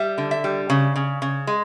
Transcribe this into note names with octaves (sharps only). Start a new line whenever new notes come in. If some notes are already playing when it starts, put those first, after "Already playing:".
Already playing: G3 E5
D3
E5
G3
C#3
C#3
C#3
G#3